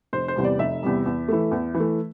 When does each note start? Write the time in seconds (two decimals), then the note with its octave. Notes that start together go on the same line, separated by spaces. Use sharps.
0.13 F1 C5
0.28 C5
0.36 E2 C3 G3
0.44 D5
0.59 F1 E5
0.83 E2 C3 G3
1.06 E2
1.28 E3 A3
1.51 E2
1.74 E3
1.80 A3